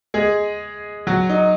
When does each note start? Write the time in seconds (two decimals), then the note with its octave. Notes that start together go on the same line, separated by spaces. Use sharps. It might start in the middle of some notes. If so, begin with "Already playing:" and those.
0.14 G#3 G#4
1.07 F#3 F#4
1.29 D#4